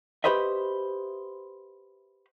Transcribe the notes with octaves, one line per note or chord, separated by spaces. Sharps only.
F#4 G4 B4 C5 D#5 E5